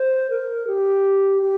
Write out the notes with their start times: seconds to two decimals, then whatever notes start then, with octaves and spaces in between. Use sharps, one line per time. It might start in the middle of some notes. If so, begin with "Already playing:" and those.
Already playing: C5
0.30 A#4
0.67 G4
1.42 G4